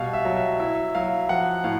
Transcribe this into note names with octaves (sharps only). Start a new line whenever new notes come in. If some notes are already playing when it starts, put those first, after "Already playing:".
Already playing: B2 G3 F5
E5
F#3
E5
E4 E5
F#3 F5
F3 F#5
A2 F5